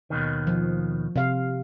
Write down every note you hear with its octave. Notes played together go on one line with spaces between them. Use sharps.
D#2 B2 D#3
F3
C3 F5